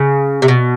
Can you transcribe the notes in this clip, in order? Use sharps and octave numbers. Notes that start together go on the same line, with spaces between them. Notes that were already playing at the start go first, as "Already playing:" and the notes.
Already playing: C#3
C3
B2